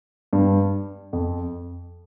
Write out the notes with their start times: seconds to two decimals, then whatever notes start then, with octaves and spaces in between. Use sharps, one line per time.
0.33 G2
1.13 F2